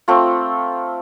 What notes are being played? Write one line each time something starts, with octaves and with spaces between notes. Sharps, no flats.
A3 C4 F4